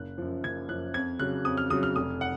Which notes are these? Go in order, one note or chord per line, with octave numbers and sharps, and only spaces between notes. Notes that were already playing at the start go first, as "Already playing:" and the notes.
Already playing: F#1 F#6
F#2 F3
F#1 G#6
F#2 F3 F#6
F2 G#6
C#3 F#3 F#6
F2 D#6
F6
C#3 F#3 D#6
F6
F1 D#6
F#5